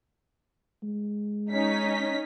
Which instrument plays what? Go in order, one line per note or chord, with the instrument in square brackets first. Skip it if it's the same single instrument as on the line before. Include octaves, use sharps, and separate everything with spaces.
[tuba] G#3
[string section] C#4 D#4 B6